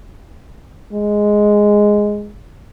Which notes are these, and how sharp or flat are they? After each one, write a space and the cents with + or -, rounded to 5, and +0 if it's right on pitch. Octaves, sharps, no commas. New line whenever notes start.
G#3 +0